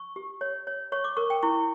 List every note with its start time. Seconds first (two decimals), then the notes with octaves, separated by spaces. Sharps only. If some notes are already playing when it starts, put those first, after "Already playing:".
Already playing: C#6
0.16 G4
0.41 C#5
0.67 C#5
0.92 C#5 C#6
1.04 D6
1.17 A#4 C#6
1.30 G5
1.43 E4 C#6